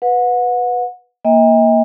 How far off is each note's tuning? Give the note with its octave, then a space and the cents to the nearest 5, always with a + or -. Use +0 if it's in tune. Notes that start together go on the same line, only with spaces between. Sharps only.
B4 +0 F#5 -30
A#3 +0 D#5 +45 G5 +45